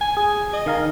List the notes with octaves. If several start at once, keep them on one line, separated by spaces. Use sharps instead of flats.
G#5
G#4 G#5
D#5
D#3 F5 A#5